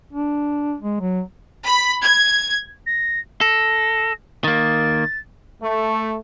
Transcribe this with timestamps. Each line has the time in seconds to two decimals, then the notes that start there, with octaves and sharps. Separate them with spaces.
0.13 D4
0.81 G#3
1.00 F#3
1.64 B5
2.02 G#6
2.86 A#6
3.41 A4 A#6
4.44 D#3 A#3 A6
5.62 A3